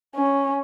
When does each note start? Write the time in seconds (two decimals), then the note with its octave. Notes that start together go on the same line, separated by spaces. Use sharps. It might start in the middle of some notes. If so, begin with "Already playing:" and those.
0.15 C#4